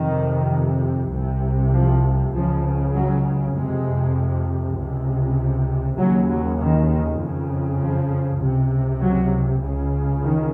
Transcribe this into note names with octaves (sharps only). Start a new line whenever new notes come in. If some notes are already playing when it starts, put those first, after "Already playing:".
Already playing: F2 C3 D#3
C2 C3
F3
C#2 C#3 F3
F#3
F2 C3 G#3
C#2 C3
D#2 C#3 F#3
F#3
D#3
F2 C#3
F3
C#2 C3
F#3
C#2 C#3
D#3